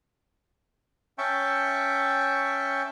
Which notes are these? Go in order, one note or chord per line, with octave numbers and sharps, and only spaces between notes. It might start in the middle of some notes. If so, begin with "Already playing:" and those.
C#4 E5 G5 A5 C#6